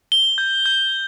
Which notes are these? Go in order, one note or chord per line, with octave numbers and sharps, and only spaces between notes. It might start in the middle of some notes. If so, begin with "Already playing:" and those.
G7
G6
G6